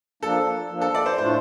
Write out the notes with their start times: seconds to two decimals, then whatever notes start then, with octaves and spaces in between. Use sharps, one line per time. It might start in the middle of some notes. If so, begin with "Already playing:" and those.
0.23 F3 A#3 D4 A4
0.70 F3 A#3 D4
0.81 A4
0.95 D5
1.06 C5
1.18 A2 A3 D4 F4 C5